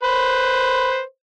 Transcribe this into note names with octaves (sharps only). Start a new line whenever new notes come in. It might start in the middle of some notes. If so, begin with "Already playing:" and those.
B4 C5